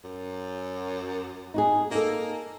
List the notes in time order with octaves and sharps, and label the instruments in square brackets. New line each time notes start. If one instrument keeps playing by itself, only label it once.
[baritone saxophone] F#2
[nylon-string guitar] D#4 F#4 G#4
[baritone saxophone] A#3 [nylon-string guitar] D#4 A4